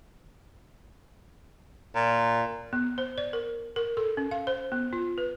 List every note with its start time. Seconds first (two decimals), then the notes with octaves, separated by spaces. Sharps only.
1.95 A#2
2.73 B3
2.98 C5
3.18 D5
3.33 A#4
3.76 A#4
3.97 A4
4.17 C#4
4.31 F5
4.47 C5
4.72 B3
4.93 F4
5.18 B4